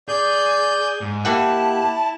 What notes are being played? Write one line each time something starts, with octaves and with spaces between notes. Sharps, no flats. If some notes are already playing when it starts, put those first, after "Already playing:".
G#4 D5 G6
G#2
A#3 E4 G4 F#5 A5